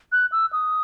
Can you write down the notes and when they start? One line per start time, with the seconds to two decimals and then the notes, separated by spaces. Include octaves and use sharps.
0.12 F#6
0.32 E6
0.52 D#6